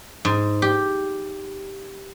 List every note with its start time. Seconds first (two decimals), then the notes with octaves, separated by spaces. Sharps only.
0.25 G#2
0.62 G4